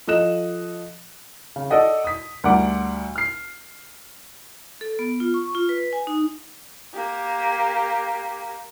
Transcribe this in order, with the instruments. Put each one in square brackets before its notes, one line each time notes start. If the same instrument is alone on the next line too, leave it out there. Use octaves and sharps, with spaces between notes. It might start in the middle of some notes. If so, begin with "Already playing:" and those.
[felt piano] F3 A4 D#5 F#6 E7
[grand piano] C#3
A4 D5 D#5 F#5
D#6 B6
D2 G3 A#4 D5 F#5 D6
F6 C7
[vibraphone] A4
B3
F4
C#6
F4
B4
G#5
D#4
[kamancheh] A#3 G4